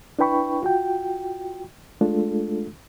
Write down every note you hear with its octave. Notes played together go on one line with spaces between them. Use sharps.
D4 E4 B4 G5 B5 C#6
F4 F#4 G5
G#3 A3 D4 F4 A4